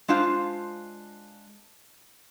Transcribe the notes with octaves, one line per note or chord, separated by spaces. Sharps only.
G#3 D4 F4 C5 F5